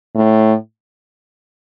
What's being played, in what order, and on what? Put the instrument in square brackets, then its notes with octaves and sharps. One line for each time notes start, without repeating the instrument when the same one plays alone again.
[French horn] A2